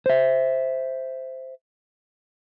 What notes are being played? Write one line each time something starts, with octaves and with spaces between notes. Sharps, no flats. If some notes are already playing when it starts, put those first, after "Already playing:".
C5 E5